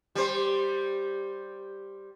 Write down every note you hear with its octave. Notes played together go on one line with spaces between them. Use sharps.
G3 C5